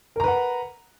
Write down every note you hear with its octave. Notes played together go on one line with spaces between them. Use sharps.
A#4 B4 F#5 A#5